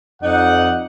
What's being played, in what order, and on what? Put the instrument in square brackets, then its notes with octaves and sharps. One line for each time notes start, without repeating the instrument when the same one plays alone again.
[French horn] F2 [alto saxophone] D#4 [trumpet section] D5 F#5